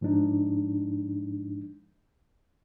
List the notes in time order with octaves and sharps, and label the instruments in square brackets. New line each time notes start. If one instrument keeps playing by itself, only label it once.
[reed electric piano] G#2 F3 G#3 D4 D#4